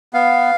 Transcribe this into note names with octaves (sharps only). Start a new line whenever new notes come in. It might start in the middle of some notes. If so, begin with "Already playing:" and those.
B3 F5